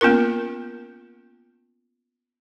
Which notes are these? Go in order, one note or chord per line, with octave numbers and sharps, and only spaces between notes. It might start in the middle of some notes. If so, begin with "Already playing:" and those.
A#3 B3 C#4 F4 A#4